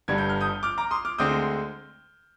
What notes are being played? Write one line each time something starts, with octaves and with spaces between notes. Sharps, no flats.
G1 G2 D3 G3 G#6
G6
F6
D#6 G6
D6 F6
A#5 D6
C6 D#6
D6 F6
D2 D3 G#3 C4 D#6 G6